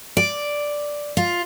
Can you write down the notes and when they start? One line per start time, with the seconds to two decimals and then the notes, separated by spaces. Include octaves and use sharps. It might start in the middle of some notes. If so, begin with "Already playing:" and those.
0.17 D5
1.17 F4